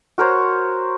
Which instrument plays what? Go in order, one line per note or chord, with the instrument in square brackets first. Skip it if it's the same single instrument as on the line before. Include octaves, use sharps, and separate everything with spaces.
[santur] F#4 A#4 C5 C#5